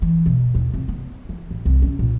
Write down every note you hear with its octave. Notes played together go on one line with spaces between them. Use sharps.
E3
B2
D#2
C2
B3
E3
A1
C2
C#4
A#2